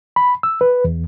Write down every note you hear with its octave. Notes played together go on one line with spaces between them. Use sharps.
B5
E6
B4
E2